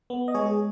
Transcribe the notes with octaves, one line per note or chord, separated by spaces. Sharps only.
B3
D#5
G#3 G#4 C#5
G#4